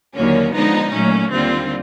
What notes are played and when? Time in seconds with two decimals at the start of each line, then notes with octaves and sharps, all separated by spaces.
0.15 D#2 D3 F#3 A#3 C#4
0.53 D3 F3 G#3 B3 D#4
0.92 A#2 F#3 A3 C#4
1.31 D#2 D3 G3 C4 F4